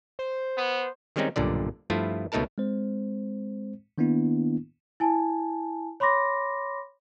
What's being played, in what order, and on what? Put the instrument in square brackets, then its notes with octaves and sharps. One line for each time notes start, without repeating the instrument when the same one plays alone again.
[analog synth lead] C5
[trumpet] B3
[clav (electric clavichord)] D#3 G3 G#3 C4 C#4 D#4
B1 G2 A#2 D3 D5
G2 F3 A3 E4 F4
C#2 B2 A3 D#4 A#4 A5
[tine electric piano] G#3 C4 C5
D#3 A#3 B3 D4 E4
[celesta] E4 G#5 A5
C#5 B5 C6 D6 A#6